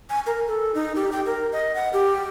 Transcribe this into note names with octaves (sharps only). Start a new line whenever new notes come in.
G#5
A#4
A4
D#4
G4
G5
A#4
D#5
F#5
G4